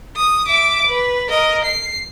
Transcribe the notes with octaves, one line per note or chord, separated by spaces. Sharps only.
D#6
E5 D6
B4
A#4 D#5
C7